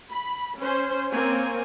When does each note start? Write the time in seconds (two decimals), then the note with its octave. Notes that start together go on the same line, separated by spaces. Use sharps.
0.11 B5
0.59 C#4 C5
1.11 A#3 C4 C#5 G#5